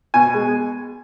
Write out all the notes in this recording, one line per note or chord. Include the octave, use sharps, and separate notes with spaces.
B2 G#5
G#3